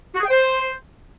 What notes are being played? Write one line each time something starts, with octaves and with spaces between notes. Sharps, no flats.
F#4
G#4
G5
C5